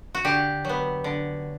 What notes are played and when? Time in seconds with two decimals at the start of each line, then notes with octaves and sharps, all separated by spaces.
0.15 F#4
0.24 D3 G4
0.65 F#3 B3
1.04 D3